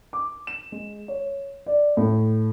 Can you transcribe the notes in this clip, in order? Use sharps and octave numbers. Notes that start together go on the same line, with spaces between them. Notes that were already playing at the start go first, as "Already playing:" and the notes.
D6
E7
G#3
C#5
D5
A2